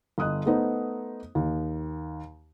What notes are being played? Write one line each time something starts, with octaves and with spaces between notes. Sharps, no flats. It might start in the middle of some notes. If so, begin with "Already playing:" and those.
G1 D#5 D#6 F#6
A3 B3 D#4 C5
D#2